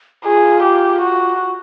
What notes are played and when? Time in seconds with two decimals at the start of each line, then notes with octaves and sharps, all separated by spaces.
0.25 F4 G#4
0.63 G4
1.01 F#4